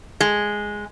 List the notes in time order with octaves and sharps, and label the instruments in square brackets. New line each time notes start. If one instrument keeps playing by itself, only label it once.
[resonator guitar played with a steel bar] G#3